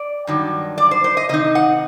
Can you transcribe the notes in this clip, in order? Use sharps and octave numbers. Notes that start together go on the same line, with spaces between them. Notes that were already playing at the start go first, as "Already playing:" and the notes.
Already playing: D5
G2 D#3 F#3
D5
C5
C5
D#5
C3 D#3 C4 D#4 D#5
F#5